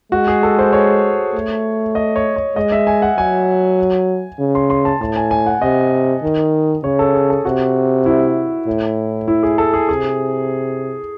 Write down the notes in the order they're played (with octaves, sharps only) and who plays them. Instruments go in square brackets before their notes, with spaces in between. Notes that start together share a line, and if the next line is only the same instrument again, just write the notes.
[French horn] G#3 [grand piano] F#4
[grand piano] G#4
A4
C5
C#5
[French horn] A3
[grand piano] D#5
C#5
C#5
[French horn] G#3 [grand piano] D#5
[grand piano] E5
G#5
F#5
[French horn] F#3 [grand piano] G#5
[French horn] C#3
[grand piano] C6
C6
A5
[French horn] A2 [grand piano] A5
[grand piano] G#5
G#5
F#5
[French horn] C3 [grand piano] D#5
[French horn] D#3
[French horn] C#3 [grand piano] C#5
[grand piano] A4
G#4
A4
[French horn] C3 [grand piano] F#4
[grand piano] E4
[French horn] A2
[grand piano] E4
G#4
A4
G#4
[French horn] C3 [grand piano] G#4